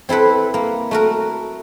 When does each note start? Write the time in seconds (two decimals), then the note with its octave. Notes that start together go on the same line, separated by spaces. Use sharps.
0.09 C4 E4 A4 B4
0.54 A#3
0.91 A3 F#4 A#4